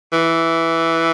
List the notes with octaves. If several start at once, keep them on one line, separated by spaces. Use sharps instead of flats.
E3